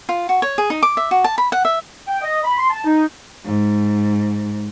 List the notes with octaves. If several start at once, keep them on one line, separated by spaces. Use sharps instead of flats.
F4
F#4
C#5
G#4
D#4
D6
E5
F#4
A5
B5
F#5
E5
G5
D#5
B5
C6
A5
D#4
G#2